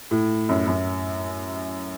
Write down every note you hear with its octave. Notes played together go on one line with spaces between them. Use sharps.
A2
F#2
F#2